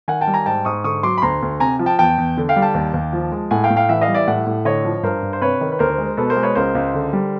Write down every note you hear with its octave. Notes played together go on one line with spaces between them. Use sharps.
D#3 F#5 G#5
G5 A5
G3
G#5 A#5
G#2 G5 A5
G#2 C#6 D#6
D3 C#6 D#6
F#3 C6 D6
B5
D2 A#5 C6
D2
C3 G#5 A#5
F3
G5 A5
E2 G5 A5
E2
D3
F5 G5
G3
G5 A5
D#2
D#2
F3
G#3
A2 F#5 G#5
F5 G5
A2
F5 G5
E3 E5 F#5
D#5 F5
G3
D5 E5
A2 E5 F#5
A2
D3 C#5 D#5
F3
G2 A#4 C5
G2
C5
C3 B4 C#5
D#3
B4
D2 A#4 C5
G#3
B2 A4 B4
A#4 C5
G#3
B4 C#5
C#2 A#4 C5
C#2
D3
G3